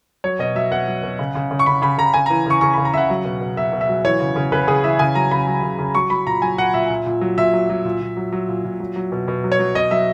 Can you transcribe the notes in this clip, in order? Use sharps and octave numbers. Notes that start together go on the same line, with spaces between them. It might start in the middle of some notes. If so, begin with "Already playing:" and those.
F#3 C#5
B2 D#5
F#3 E5
B2 F#5
F#3
B2
C#3
C#3
C#3
C#6
C#3 B5
C#3 B5
C#3 A#5
C#3 G#5
E3 A#5
C#3 C#6
C#3 C#6
C#3 B5
A#5
C#3 E5 F#5
F#3
B2
B2
B2 E5
B2
E5
F#3
E3 C#5
C#3
C#3
C#3 B4
C#3 G#4
E3 E5
C#3 G#5
F#3 A#5
C#3 B5
F#3
C#3
C#3
F#3 C#6
F#3 B5
A#2 A#5
F#3 G#5
A#2 F#5
A#2 E5
A#2
A#2
F#3
A#2 E5
F#3
F#3
A#2
A#2
F#3
F#3
A#2
A#2
F#3
F#3
B2
B2
F#3
C#5
F#3
B2 D#5
F#3 E5